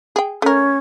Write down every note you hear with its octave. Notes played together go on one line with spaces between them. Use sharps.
G#4 G5
A3 C#4 A#4